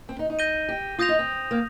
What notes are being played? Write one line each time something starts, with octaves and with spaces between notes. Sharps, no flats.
C4
D#4
D#4
G6 A#6 D#7 G7
G4
F4 D#6 G6 A#6 F7
D#4
C4
A#3